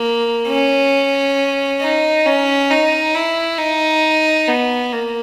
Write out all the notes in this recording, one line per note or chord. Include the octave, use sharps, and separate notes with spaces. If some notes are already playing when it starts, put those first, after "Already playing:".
Already playing: A#3
C#4
D#4
C#4
D#4
E4
D#4
B3
A#3